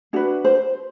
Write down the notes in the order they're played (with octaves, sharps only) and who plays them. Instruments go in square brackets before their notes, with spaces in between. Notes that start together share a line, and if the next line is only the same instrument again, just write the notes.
[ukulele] D4 F#4 B4
C5